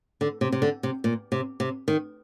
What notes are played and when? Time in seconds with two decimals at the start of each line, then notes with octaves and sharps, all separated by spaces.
0.21 D3
0.41 C3
0.52 C3
0.62 D3
0.83 C3
1.04 A#2
1.32 C3
1.60 C3
1.88 D#3